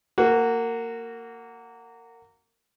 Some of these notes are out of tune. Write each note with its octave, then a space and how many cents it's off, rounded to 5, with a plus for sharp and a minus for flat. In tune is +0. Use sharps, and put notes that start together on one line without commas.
A#3 -20 F#4 +0